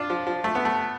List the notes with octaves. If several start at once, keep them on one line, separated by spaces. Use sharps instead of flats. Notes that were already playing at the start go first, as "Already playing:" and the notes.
Already playing: D4 F4
F3
F3
A3
B3
A3